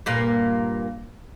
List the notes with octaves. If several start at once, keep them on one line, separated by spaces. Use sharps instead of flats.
G2 A#2 A#3